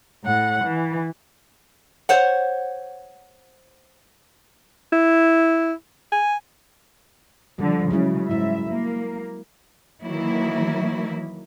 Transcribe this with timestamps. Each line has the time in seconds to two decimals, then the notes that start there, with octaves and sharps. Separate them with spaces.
0.24 A2 F#5
0.64 E3
2.09 C5 C#5 F#5
4.92 E4
6.12 G#5
7.59 D3 F3 G3
7.91 C#3 F#3 G#3 E4
8.31 G#2 E4 E5
8.69 A#3
10.03 D#3 E3 F#3 A#3 E4